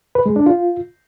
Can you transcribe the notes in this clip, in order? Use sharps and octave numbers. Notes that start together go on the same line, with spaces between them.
B4
G#3
D4
F4